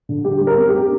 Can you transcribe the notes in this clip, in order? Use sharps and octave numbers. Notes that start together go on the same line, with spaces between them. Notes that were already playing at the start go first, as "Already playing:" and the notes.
D3
G3 G4
G3
A#4
C4
G4
C4